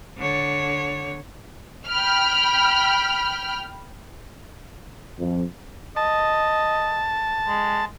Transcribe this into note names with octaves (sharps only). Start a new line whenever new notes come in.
D3 C#5
G5 B5 F6
F2
D#5 A5
G#3